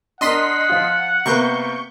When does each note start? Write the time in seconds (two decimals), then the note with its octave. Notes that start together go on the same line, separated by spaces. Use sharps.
0.21 D4 A#4 D#5 F#5 C6 B6
0.69 F3 F4
1.26 C3 A#3 B3 C#6 G6